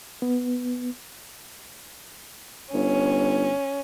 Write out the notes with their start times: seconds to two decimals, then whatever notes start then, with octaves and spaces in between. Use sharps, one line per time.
0.22 B3
2.74 G1 C#4